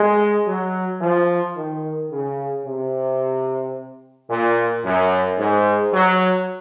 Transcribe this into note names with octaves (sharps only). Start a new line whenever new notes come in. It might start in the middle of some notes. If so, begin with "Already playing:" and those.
Already playing: G#3
F#3
F3
D#3
C#3
C3
A#2
F#2
G#2
F#3